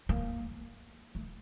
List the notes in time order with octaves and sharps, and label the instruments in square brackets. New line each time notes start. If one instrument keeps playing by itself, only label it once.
[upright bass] A#3
A3